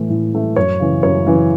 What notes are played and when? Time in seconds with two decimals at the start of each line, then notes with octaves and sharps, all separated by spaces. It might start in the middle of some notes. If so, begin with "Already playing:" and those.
Already playing: A2 E3 A3
0.10 A2
0.33 E3 A3
0.56 F#2 C#5
0.80 C#3 E3
1.03 F#2 C#5
1.26 C#3 E3